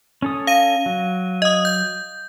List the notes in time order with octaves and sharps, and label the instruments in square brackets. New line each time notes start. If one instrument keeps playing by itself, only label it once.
[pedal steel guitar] C#4 A4 D#6
[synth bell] F5 D#7
[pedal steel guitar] F#3
[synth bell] D#5 D#6
G6